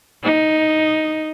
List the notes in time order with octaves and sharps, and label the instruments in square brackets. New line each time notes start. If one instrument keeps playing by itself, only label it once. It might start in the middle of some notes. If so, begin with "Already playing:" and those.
[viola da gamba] D#4